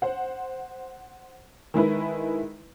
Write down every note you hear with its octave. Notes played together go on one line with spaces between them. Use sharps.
C5 F#5
D#3 G#3 E4 B4